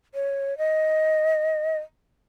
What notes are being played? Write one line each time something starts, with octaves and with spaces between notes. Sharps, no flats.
C#5
D#5